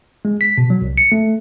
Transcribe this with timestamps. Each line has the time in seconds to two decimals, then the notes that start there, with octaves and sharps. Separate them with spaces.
0.25 G#3
0.41 B6
0.58 B2
0.70 F#3
0.82 C2
0.98 C#7
1.12 A3